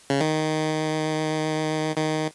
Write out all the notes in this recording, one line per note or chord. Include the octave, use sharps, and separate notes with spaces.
C#3
D#3
D#3